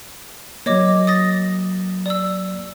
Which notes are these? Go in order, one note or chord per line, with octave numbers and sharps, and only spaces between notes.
F#3 A#3 C#5 D#5 D6
D#6 A6 A#6
D5 E6